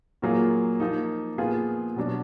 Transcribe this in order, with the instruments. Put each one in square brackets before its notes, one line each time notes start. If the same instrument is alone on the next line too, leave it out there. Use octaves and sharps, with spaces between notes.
[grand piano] A#2 F#3 A#3 F4 G#4
F3 A#3 D#4
A#2 F3 B3 F4 G#4
B2 F#3 D4